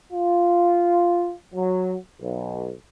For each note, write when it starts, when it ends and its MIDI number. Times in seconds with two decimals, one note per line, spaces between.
0.12 1.33 65
1.54 1.94 54
2.21 2.71 35